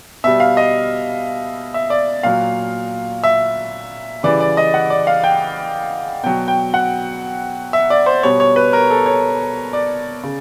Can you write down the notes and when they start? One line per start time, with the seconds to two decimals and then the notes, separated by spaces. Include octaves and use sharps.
0.24 B2 G3 E5
0.40 F5
0.57 D#5
1.74 E5
1.90 D5
2.23 A#2 F#3 F5
3.24 E5
4.23 C#3 E3 G3 D5
4.40 D5
4.57 D#5
4.74 F#5
4.90 D5
5.07 F5
5.24 G5
6.24 B2 F#3 G5
6.48 G5
6.74 F#5
7.73 E5
7.90 D5
8.06 C5
8.23 B2 G3 C#5
8.40 C#5
8.56 B4
8.73 A#4
8.91 A4
9.06 C#5
9.73 D5
10.23 C#3